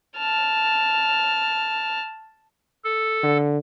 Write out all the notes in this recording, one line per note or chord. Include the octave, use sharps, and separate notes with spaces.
A5 F6
A4
D3